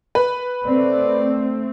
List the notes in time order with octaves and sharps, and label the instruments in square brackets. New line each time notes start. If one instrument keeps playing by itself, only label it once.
[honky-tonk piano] B4
[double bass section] A3 C4 [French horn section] D5